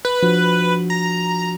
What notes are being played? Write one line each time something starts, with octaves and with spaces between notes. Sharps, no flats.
B4
F3 D4 F#4
A#5